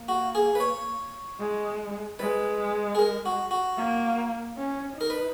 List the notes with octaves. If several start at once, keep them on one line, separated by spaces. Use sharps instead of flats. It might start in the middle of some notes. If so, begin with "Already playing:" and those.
Already playing: A#3
F#4
G#4
B4
C#5
G#3
G#3 B4
G#4
A#4
F#4
F#4
A#3
C#4
D#4 A#4
B4